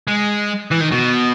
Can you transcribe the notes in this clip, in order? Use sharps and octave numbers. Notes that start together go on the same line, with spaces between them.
G#3
E3
D#3
B2